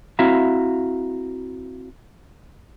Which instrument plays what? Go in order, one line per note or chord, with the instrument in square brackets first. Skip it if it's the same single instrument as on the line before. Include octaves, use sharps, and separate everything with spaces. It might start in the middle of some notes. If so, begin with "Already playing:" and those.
[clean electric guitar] C4 E4 F#4 E5 F5 A#5